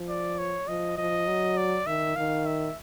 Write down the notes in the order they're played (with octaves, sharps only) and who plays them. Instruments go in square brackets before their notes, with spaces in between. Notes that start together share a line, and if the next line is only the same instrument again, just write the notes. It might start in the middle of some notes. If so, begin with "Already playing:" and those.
Already playing: [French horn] F3
[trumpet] D5
C#5
[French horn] F3 [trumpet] D#5
[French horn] F3 [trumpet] D#5
[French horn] F#3
[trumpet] D5
[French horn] D#3 [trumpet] E5
[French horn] D#3 [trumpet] F5
[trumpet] E5